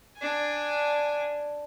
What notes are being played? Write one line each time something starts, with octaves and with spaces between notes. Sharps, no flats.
D4 G#5